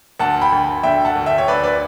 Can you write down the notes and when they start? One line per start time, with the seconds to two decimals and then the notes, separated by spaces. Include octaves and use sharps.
0.20 D2 F#5 A5
0.41 G5 B5
0.52 D2
0.83 D3 E5 G5
1.05 F#5 A5
1.16 D2
1.26 E5 G5
1.38 C#5
1.48 D2 B4 D5
1.64 B4 D5